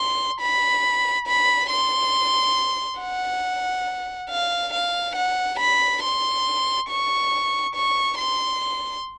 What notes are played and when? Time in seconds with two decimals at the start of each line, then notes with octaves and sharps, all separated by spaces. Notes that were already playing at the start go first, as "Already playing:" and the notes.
Already playing: C6
0.40 B5
1.27 B5
1.69 C6
3.00 F#5
4.30 F5
4.73 F5
5.15 F#5
5.59 B5
6.02 C6
6.89 C#6
7.75 C#6
8.18 C6